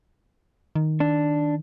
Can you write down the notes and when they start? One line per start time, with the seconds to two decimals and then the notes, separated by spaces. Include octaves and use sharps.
0.76 D#3
1.00 D4